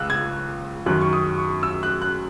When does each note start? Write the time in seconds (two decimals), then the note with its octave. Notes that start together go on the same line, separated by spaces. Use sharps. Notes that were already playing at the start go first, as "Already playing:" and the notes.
Already playing: C#2 C#3 E6 F#6
0.10 G#6
0.86 F#2 D#3 F#6
1.02 C#6
1.13 D#6
1.38 C#6
1.63 E6
1.83 F#6
2.02 F#6